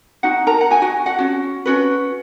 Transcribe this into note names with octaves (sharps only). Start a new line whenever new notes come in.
D#4 F#4 F#5
A#4 A#5
F#5
D#4 F#4 G#5
F#4 F#5
F#4 F#5
C#4 F#4
C#4 F#4 B4